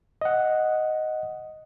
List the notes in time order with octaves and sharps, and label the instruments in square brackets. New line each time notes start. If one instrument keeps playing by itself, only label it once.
[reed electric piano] D#5 F#5